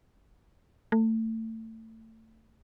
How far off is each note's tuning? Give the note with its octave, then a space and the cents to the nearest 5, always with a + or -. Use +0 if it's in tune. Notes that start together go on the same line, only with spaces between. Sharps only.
A3 +25